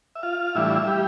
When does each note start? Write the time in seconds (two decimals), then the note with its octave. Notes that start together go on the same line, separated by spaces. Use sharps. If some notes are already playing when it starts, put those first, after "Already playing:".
0.15 E5
0.23 F4 F5
0.55 A2 E3 G3 D4 E4 E5
0.87 G3 G4